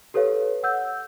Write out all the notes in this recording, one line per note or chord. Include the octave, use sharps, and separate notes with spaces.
G4 A4 B4 C#5 F5
F#5 E6 G6